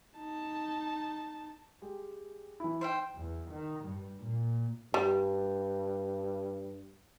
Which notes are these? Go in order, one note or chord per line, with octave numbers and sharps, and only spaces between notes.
D#4 A5
G#3 G4
E3 E4
D#4 C5 E5 G5
E2
D#3
G2
A#2
G2 G3